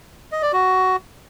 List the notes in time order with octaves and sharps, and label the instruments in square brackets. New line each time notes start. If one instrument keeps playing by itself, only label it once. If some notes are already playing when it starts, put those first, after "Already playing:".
[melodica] D#5
D5
F#4